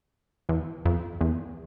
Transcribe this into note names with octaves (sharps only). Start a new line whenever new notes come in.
E2
F2
E2